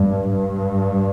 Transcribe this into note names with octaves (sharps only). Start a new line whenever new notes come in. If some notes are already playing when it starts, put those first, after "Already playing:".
Already playing: G2
G2